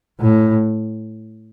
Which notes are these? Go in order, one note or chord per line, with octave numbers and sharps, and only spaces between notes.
A2